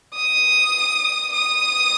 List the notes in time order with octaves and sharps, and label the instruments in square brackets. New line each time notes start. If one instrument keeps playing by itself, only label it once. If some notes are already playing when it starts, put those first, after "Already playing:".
[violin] D#6
D#6